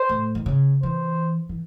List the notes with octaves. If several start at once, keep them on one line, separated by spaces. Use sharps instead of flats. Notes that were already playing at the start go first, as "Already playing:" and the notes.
Already playing: C5
A2
D#3
C#3
E3 C5
E3